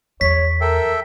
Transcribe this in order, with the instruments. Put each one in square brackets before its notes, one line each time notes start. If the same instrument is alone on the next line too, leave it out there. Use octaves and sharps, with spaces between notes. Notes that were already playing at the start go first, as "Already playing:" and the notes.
[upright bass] E2 [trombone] C#5 [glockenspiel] B6
[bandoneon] A4 E5 G5 [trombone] A#4